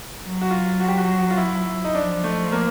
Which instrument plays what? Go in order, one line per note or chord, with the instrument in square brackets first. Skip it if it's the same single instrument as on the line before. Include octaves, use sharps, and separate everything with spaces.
[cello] F#3
[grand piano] F#4
F4
F#4
G4
F#4
F4
E4
D#4
[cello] F3 [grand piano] D4
[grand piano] A3
A#3